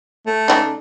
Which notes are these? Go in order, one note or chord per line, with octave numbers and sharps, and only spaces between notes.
A3
C#3 D4 D#4